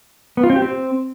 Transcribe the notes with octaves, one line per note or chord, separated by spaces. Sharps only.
B3
F4
C4
G4
C4